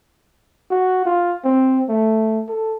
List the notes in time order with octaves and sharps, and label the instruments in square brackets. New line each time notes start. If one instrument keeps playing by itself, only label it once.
[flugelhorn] F#4
F4
C4
A3
A4